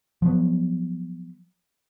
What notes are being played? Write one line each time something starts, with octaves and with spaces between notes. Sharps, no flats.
F3 F#3 B3